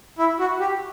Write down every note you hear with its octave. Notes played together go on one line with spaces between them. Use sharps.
E4
F#4
G4